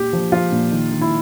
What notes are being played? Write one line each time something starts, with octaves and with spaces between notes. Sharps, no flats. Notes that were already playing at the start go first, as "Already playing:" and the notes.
Already playing: A#2 G4
F3
F3 F4
A#2
D#3
D#3
E4